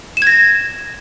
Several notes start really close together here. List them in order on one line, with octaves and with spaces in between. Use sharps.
E7 G#6 A#6